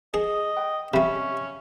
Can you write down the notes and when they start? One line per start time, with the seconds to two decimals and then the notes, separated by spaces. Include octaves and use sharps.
0.14 G#4 D#5
0.56 B4 G5
0.94 C3 G3 C#4 E5 F5 B5